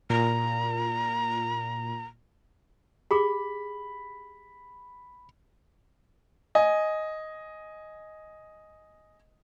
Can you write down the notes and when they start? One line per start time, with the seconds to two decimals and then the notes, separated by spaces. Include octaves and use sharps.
0.10 A#2 A#5
3.11 G4 G#4 B5 D6
6.55 D#5 G#5